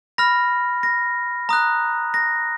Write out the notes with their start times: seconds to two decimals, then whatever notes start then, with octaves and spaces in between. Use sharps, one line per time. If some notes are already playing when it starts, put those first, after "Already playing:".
0.18 B5 F6 A#6
0.83 A#6
1.49 A#5 D#6 F#6
2.14 A#6